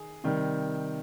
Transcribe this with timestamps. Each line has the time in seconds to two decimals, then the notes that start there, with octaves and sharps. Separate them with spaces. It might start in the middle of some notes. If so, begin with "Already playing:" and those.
Already playing: D#3 G#4
0.24 C3 D#3 G3